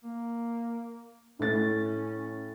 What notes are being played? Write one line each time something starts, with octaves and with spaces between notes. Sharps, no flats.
A#3
A2 A3 C#4 A6